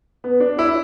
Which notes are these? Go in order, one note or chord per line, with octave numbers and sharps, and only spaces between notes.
B3
D4
E4